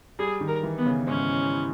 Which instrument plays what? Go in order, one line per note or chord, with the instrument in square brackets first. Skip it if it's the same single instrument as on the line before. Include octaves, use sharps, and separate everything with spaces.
[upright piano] G3 [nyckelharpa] G#4
[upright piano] D#3
[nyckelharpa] A#4
[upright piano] E3
[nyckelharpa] B3
[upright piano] C#3
[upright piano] G#2 [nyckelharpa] C#4